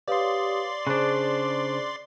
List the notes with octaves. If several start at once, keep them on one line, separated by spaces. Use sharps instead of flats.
G4 B4 C#5 D5 F5 C6 D#6
C#3 D4 G#4 C5 F#6